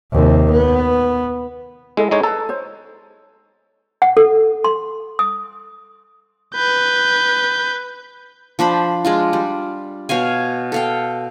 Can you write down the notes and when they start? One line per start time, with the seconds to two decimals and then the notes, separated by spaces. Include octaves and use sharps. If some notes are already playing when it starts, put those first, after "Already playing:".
0.12 D#2 C3
0.52 B3
1.97 G#3 E4 A4 D#5
2.11 G#3 D#4 C#5
2.23 A4 B4 A#5
2.49 C5 C#5
4.02 F#5
4.17 A4
4.64 C6
5.19 D#6
6.55 B4 G6
8.59 F3 D4 C5 B5
9.05 G#3 D4 F4
9.33 G3
10.09 B2 C#5 F5 G#5
10.72 A4 F5 G5